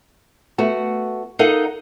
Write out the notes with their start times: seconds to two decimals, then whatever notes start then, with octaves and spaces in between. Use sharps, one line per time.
0.58 A3 B3 F#4
1.39 D#4 A4 A#4 D#5 F5 F#5